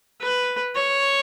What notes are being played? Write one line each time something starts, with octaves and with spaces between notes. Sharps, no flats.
B4
C#5